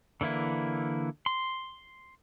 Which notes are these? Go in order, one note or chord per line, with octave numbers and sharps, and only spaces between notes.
D3 E3 A#3 E4
C6